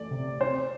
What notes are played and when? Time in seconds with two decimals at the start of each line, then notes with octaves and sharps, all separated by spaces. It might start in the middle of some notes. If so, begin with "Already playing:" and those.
Already playing: E3 A3 D5
0.11 C3
0.41 C4 C5